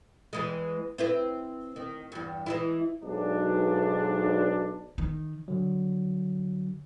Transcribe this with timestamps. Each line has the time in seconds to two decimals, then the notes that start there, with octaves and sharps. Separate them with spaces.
0.33 E2 E3 G#3
0.98 C4 E4 B4
1.76 D#3
2.12 E2 G2
2.46 E3 G#3 E4
3.04 B1 G#2 D4
4.98 D#3
5.48 D3 F#3